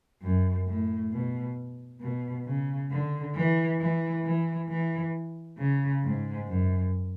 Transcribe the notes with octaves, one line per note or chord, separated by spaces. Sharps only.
F#2
A2
B2
B2
C#3
D3
E3
E3
E3
E3
C#3
G#2
F#2